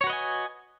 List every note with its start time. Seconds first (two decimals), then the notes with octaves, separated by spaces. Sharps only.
0.01 C#5
0.04 F#4
0.07 B4
0.10 D#5
0.13 G#5